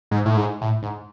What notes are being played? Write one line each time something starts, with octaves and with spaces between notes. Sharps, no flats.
G#2
A2
G#2
A2
G#2